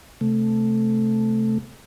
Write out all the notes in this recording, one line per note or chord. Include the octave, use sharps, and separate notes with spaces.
C3 A3